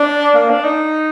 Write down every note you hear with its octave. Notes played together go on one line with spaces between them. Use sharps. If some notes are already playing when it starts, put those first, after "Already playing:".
Already playing: D4
A#3
D4
D#4